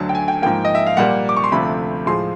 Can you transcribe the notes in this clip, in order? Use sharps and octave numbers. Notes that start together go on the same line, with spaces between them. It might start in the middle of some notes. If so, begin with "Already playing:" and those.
Already playing: D2 D3 F#3 A5
G5
G#5
G5
G#2 F3 A#3 G5
D#5
E5
F5
A#2 G3 A#3 F#5
D6
C#6
C6
D2 C3 F3 A3 B5
A2 F3 G#3 C6